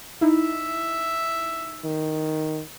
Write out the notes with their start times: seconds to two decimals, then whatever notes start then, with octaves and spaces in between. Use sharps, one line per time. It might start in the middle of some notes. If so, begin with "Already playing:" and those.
0.21 D#4 E4 E5
1.84 D#3